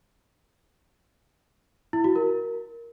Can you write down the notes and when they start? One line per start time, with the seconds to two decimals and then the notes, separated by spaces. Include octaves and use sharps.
1.93 E4
2.04 F#4
2.16 A#4